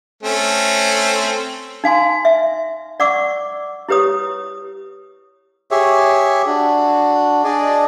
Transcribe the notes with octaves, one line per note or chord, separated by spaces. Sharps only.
A3 C4 C#4
D#4 F5 G#5 C6
E5
D5 F#5 C#6 D6 E6
E4 G4 B4 C#5 D#6
G4 G#4 C#5 E5
D4 F#4
D4 G#4 D5 D#5